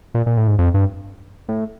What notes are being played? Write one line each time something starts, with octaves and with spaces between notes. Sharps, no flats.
A#2
A#2
A2
G#2
F2
G2
A2